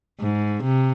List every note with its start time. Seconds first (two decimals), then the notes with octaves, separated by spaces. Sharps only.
0.21 G#2
0.63 C3